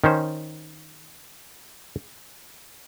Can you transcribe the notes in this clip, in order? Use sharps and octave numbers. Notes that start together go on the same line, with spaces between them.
D#3 C#4 C5